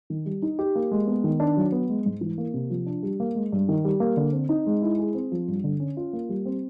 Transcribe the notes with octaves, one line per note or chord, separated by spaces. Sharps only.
D#3
G3
D#4
G4
A#3
G#3
B3
D#3
D4
F#3
B3
G#3
G#2
E3
A#3
C3
F3
D4
G3
A#3
G#3
G2
D#3
G3
A#3
D3
C4
D#4
G#3
E4
G#4
C4
F3
G2
D3
C#4
F4
A#3
G3
C4